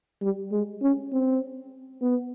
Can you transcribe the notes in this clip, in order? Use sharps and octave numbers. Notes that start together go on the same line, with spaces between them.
G3
G#3
C#4
C4
B3